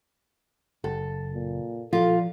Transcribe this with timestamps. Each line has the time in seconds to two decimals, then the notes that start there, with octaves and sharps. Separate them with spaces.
0.84 F#1 A4
1.34 A#2
1.93 A#2 F3 F4 A4